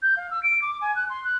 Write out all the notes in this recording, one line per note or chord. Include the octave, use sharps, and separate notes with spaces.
G6
F5
E6
D7
D6
G#5
F#6
C6
F#6